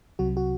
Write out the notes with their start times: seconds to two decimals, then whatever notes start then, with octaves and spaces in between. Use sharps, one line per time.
0.19 C2 C3 F#3 F#4
0.37 F#4